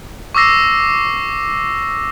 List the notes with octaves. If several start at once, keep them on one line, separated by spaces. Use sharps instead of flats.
C#6 D6 E6 A#6 C7